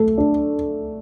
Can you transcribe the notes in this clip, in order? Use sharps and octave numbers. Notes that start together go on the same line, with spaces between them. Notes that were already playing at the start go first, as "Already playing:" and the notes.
Already playing: A3 A4
D4